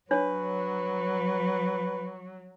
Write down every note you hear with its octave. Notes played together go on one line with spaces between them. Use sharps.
F#3 D4 B4 C#5